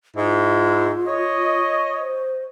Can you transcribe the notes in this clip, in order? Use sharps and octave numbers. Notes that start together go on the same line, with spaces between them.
G#2 E4 F4
C#5 D#5
C5